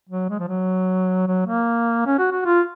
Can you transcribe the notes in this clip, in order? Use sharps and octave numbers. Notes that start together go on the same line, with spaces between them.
F#3
G#3
F3
F#3
F#3
A#3
C#4
F#4
F#4
F4